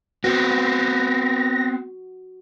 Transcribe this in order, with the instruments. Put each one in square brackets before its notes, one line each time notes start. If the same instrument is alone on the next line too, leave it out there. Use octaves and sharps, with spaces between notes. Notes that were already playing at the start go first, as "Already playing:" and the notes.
[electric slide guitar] B3 C4 [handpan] F#4 [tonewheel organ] A#6